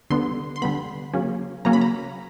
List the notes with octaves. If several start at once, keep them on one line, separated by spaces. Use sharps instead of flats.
D3 G3 B3 C6
C6
D3 G3 B3 B5
C#3 F#3 A#3 C#4
C#3 F#3 A#3 C#4 A#5
B5
A#5